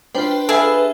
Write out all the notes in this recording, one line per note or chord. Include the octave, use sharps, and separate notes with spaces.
D4 F4 B4 C5 G5
G#4 A4 B4 E5 F5